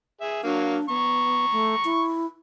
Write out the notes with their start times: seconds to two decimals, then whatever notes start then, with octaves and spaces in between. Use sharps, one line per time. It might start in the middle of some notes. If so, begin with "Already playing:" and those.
0.21 G#4 E5
0.44 F#3 A#3 D4 F5
0.89 B3 A#5 C#6
1.52 A3
1.85 E4